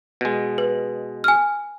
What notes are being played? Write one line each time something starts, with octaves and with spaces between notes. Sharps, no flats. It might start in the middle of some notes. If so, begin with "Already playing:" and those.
B2 G#3
B4
G#5 F6